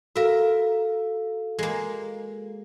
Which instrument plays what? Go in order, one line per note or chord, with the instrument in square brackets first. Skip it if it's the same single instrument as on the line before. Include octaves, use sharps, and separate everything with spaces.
[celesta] F#4 A4 F5 [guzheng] A#4 E5
[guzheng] G#3 A#3